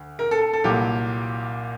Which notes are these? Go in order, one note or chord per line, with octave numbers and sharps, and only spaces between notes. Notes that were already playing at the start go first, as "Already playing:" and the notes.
Already playing: D2
A#4
A4
A4
A4
C2 A#2 F#3 G4